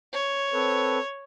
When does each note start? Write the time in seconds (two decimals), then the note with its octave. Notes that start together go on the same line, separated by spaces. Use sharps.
0.13 C#5
0.54 C4 A4 B4